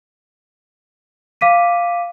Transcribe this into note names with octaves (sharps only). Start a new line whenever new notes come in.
F5 D6 B6 D#7